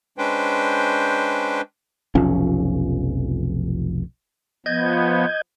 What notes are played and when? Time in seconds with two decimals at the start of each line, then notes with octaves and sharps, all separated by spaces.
0.18 G#3 C#4 D4 B4 C5 G5
2.15 F1 B1 F3 C#4
4.66 F3 B3 D#5 G6 G#6